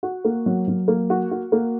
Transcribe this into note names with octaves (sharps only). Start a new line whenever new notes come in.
F#4
A#3
F#3
F#3
A#3
F#4
F#4
A#3